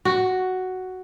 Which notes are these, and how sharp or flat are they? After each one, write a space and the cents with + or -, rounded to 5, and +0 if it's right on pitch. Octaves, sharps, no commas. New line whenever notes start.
F#4 +5